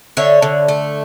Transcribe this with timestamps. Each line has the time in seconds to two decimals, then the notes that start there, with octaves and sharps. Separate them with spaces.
0.17 D3 C#5 E5
0.42 D3
0.68 A3